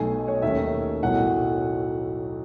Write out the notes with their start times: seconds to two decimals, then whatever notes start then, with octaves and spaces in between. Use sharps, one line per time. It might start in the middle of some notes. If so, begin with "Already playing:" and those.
Already playing: B1 B2 A3 D#4 G#5
0.28 C#5
0.35 D#5
0.42 D#2 D#3 A3 C#4 E5
1.03 B1 A2 F#3 A3 F#5